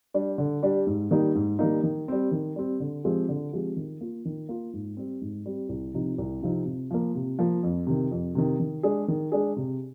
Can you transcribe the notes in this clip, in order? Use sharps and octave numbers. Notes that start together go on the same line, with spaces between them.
G3 D4 G4
D3
G3 D4 G4
G#2
D#3 G3 A#3 D#4
G#2
D#3 G3 A#3 D#4
D#3
G3 C4
D#3
G3 C4
D3
F3 G#3 C4 G4
D3
F3 G#3 C4 G4
D#3
A#3 F4
D#3
A#3 F4
G#2
G3 C4
G#2
G3 C4
C2
C3 F3 C4 D#4
C2
C3 F3 C4 D#4
C3
F3 A#3
C3
F3 A#3
F2
C3 D#3
F2
C3 D#3
D#3
G#3 D4 G#4
D#3
G#3 D4 G#4
C3